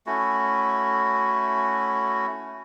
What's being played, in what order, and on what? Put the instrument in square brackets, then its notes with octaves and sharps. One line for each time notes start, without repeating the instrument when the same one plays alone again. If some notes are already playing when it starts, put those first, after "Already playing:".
[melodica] A3 C#4 E4 F#4